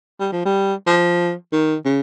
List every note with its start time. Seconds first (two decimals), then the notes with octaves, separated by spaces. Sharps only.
0.20 G3
0.32 F3
0.46 G3
0.87 F3
1.52 D#3
1.85 C#3